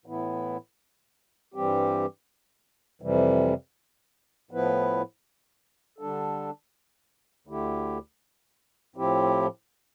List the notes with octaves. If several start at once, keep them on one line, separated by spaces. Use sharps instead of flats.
A2 E3 B3 E4
G2 E3 G3 C4 G4
F2 C3 E3 G3
A2 F3 B3 E4 B4
D3 G3 D4 A4
D2 D3 A3 E4 G4
A2 F3 C4 E4 G4